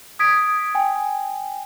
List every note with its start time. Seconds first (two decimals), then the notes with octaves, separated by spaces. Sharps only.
0.19 D#6 G#6 B6 D7
0.75 G5 G#5